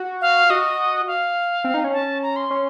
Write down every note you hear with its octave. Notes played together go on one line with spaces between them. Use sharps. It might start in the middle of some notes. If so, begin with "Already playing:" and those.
Already playing: F#4
F5
F#4 D#5
F5
C4
D#4
C#4
A5
A#5
C6
C#4